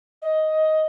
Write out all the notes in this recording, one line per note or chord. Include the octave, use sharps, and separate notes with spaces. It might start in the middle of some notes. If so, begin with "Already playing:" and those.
D#5